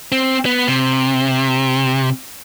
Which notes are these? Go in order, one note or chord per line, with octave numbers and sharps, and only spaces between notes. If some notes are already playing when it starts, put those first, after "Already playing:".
C4
B3
C3